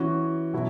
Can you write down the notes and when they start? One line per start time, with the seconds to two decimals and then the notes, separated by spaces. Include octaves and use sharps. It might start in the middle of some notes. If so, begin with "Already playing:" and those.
Already playing: E3 C#4 F#4
0.54 B2 F#3 E4